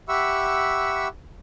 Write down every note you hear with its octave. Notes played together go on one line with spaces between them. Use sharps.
G4 E5 F#5 B5 C#6 E6